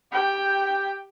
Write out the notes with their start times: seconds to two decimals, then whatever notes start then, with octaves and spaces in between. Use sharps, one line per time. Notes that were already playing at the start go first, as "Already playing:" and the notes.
0.12 G4 G5